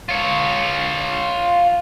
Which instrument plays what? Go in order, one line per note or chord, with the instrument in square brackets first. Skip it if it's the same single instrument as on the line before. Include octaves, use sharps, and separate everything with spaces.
[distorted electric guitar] F4 C#5